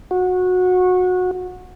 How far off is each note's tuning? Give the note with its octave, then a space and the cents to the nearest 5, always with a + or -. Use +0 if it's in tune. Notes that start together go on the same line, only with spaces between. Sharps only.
F#4 -20